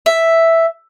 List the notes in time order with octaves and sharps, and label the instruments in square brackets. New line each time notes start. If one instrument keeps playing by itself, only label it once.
[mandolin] E5